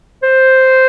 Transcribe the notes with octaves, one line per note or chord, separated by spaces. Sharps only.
C5